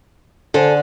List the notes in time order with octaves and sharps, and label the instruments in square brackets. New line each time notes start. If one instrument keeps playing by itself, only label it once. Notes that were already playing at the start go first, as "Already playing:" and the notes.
[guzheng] D3 [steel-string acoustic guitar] A4 C5 G#5